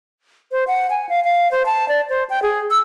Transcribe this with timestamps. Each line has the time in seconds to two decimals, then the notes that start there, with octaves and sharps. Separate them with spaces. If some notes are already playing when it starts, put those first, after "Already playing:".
0.52 C5
0.67 F#5
0.90 G#5
1.09 F5
1.24 F5
1.51 C5
1.66 A5
1.88 D5
2.10 C5
2.30 G5
2.42 G#4
2.71 E6